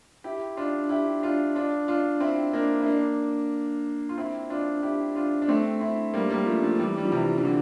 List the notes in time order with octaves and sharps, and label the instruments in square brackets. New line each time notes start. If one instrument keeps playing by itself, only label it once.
[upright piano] E4 G4
D4 F4
E4 G4
D4 F4
D4 F4
D4 F4
C4 E4
A#3 D4
E4
A#3 D4
F4
C4 E4
D4 F4
E4 G4
D4 F4
D4
A3 C4
C4 E4
G3 A#3
G3 A#3
F3 A3
F3 A3
E3 G3
G3
F3
C3 E3
E3
D3